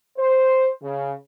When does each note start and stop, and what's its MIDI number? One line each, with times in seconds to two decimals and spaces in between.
0.18 0.70 72
0.82 1.13 49